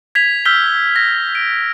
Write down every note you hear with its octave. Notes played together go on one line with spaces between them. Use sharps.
G#6 B6 F7
E6 F6 G6 B6 G7
A#6
D7